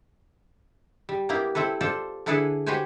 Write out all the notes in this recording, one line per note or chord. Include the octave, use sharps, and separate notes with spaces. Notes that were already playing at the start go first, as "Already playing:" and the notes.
G3
A#3 B3 E4 G4
C4 E4 A4 B4
F4 A4 C5 D5
D3 D4 E4 G#4 A4 B4
F#4 G4 B4 C5 G5 G#5